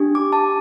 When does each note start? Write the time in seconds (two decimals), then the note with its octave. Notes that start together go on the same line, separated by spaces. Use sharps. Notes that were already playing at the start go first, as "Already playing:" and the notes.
Already playing: D4 G4
0.15 D6
0.33 A5